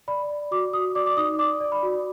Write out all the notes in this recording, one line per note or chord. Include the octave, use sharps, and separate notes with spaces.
D5 B5
D5
F#4 D6
F#4 D#6
D5 D6
D6
D#4 D#6
D5 D6
D5
B5
F#4